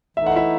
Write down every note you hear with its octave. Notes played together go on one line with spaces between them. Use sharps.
E3 A3 D#4 E5
F#5
E4 E5